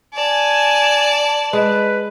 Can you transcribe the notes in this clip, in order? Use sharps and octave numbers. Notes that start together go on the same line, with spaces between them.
D5 G#5 A5
G#3 B4